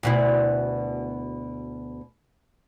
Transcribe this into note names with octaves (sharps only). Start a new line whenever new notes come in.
D2 B2 E4